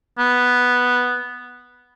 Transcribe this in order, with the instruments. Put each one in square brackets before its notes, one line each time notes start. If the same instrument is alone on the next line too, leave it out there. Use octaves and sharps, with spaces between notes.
[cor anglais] B3